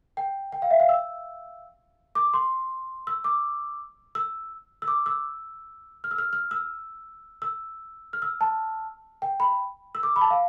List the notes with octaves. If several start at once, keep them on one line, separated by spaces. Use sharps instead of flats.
G5
G5
F5
E5
F5
E6
D6
C6
E6
D6
E6
E6
D6
E6
F6
E6
F6
F6
E6
E6
F6
E6
A5
G5
B5
E6
D6
B5
A5
F5